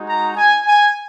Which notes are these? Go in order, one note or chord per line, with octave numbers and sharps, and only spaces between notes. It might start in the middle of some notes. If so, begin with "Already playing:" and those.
Already playing: G#3 D#4 F#4
A#5
G#5
G#5